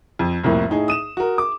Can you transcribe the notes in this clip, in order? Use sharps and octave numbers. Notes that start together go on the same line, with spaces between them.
F2
C2 F2 A2 A#3
A2 D#4 G#4
D#6 D#7 E7
F#4 A#4
D6